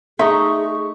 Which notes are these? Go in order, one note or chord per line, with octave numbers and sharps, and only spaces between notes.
A3 D#4 G#4 E5 C#6